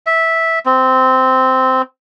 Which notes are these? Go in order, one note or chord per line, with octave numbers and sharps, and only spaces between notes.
E5
C4